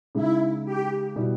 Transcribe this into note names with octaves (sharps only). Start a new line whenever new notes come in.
C#3 G#3 D#4 E4
G4
B2 G3 B3 E4